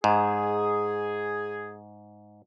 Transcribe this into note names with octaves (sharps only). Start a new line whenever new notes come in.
G#2 G#4